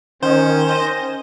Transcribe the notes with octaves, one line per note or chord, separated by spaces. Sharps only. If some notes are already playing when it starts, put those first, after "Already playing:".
D#3 C#4 C5
D#5